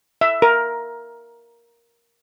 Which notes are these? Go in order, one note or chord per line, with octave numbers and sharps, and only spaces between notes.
E5
A#4